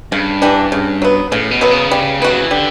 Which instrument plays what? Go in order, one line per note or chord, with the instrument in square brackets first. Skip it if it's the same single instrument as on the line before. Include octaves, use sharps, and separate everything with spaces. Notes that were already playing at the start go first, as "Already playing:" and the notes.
[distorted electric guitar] G2 [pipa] C#3
[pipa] E3 G3 D4
C#3
F#3 B3
[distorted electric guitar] A2 [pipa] C#3
[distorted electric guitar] B2
[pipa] F#3 B3
[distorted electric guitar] C#3
[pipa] G3
[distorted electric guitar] G3 [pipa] B3 F#4
[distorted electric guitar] F#3
E3
[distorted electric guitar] D3 [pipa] G3